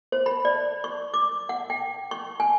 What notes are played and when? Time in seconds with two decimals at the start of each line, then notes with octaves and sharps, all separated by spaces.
0.12 C5
0.26 B5
0.45 D5
0.84 C#6
1.14 D6
1.49 F#5
1.70 G5
2.11 C#6
2.40 G#5